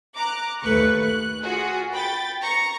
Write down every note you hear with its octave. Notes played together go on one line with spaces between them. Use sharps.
A#5 D6 F#6
D#2 A3 B4 C#6 F#6
F#6
F4 F#4 G#4
G5 B5 A6
A#5 C#6 A#6